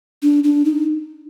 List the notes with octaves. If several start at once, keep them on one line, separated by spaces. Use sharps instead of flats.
D4
D4
D#4